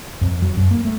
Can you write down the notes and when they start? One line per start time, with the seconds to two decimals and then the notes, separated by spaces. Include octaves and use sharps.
0.21 F2
0.42 F#3
0.57 F#2
0.71 A#3
0.85 A3